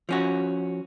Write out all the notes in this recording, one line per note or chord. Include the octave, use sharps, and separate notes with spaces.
F3 C#4 F#4